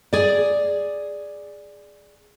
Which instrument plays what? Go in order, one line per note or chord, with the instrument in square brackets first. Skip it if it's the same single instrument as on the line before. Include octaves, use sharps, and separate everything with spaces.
[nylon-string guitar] G#4 D5